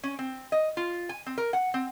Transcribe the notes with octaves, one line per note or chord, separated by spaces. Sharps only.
C#4
C4
D#5
F4
G#5
C4
A#4
F#5
C4